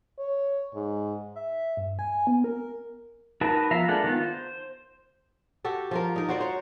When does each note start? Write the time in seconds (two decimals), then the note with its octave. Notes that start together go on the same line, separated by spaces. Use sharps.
0.19 C#5
0.74 G#2
1.36 E5
1.77 G2
1.99 G#5
2.27 B3
2.44 A#4
3.41 D#4 F#4 A#4 B4 A5
3.71 F3 B3 E5 F5 A#5
3.88 G#3 A#3 D4 A4 F#5
4.04 D#3 B3 F4
4.21 C5
5.64 F#4 G4 A4
5.91 F3 F4 A#4
6.16 D#4 A#4
6.29 F#4 C5 D5
6.40 C5 C#5